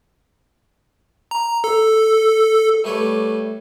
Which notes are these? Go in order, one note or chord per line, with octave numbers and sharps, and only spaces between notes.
A#5
A4
G3 A3 B4 C#5 D5